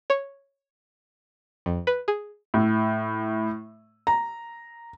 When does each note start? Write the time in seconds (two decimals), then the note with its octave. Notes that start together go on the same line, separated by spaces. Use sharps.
0.10 C#5
1.66 F2
1.87 B4
2.08 G#4
2.54 A2
4.07 A#5